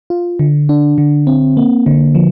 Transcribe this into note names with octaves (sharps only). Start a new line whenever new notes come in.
F4
D3
D4
D3
C4
A#3
D3
F3